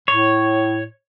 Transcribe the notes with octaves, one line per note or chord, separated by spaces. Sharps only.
A2 C#5